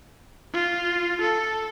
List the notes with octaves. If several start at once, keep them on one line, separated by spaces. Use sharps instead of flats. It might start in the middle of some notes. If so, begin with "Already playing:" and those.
F4
A4